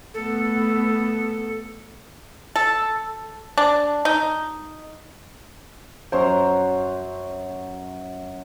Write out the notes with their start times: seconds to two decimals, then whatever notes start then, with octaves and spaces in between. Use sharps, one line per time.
0.14 A3 B3 A4
2.56 A4
3.58 D4
4.05 D#4
6.12 F#2 C5 A#5